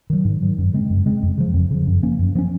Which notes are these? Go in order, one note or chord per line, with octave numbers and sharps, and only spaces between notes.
D#3 F#3
G#2
D#3 F#3
F#2
C#3 G#3 C4
F#2
C#3 G#3 C4
F2
C#3 F3
F2
C#3 F3
F#2
F3 A#3 C#4
F#2
F3 A#3 C#4